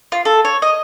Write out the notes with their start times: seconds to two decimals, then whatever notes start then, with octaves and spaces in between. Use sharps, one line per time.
0.12 F4
0.25 A4
0.45 C#5
0.62 D#5